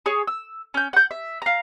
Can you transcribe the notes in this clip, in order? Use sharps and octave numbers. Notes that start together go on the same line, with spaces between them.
G#4 C#5
E6
C#4 G6
F#5 G6
E5
F5 A#5